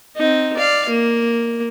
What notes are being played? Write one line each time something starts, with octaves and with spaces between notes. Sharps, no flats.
C4 D#4
D5 F5
A#3